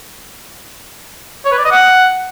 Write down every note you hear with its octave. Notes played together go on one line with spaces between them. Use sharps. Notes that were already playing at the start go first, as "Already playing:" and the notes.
C#5
B4
D5
D#5
F#5